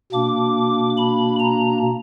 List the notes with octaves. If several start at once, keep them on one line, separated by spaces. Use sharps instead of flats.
B2 A#3 D4 D6
B5
A#5